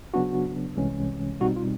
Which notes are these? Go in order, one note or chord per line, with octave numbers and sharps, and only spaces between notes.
C#3 F#3 B3 D4 F#4
C2 C3 E3 G#3 C#4
B2 G3 C4 D#4 F#4
F4